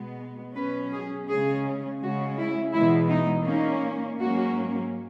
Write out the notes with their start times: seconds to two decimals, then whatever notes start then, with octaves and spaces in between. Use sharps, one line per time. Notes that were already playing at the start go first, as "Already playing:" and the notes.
Already playing: B2 G#3 B3
0.56 B2 F#3 C#4 B4
0.93 G#4
1.28 C#3 G#3 C#4 G#4
2.01 C#3 G#3 C#4 F#4
2.39 E4
2.74 E2 B2 G#3 B3 E4
3.10 D#4
3.47 A#2 A#3 C#4 D#4
4.20 G#2 F#3 A#3 C#4 F#4